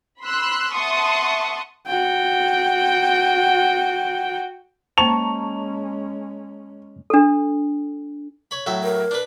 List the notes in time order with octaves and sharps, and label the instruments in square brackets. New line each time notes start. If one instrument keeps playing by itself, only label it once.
[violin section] B5 C6 E6 F#6
E5 F#5 A5 C6 C#6 D#6
[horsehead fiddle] F#4 G5
[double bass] G#3 C#4 [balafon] A#3 C5 [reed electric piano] A5 A#5 C#6 [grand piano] F7
[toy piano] D4 A4
[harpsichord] C#5 B5
A2 F#3 E5
[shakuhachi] A#4
[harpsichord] D4 B4